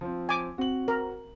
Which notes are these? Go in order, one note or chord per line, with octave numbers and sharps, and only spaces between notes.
F3 C4
G#5 D6
C4 F#4 F#7
A#4